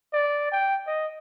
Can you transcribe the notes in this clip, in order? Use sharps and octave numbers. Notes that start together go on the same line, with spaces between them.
D5
G5
D#5